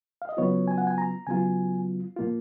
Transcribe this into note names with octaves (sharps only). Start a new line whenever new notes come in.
F5
D#5
C#3 F#3 B3 F4 C#5
G#5
F#5
G#5
A#5
C#3 F#3 B3 F4 G#5
A#2 F3 A#3 F4